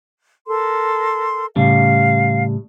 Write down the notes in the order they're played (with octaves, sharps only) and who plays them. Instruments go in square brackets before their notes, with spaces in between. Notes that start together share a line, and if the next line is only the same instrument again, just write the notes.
[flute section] A4 A#4 C6
[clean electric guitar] A2 C#3 G3 [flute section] F5